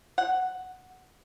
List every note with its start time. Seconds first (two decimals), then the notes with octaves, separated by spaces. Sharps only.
0.18 F#5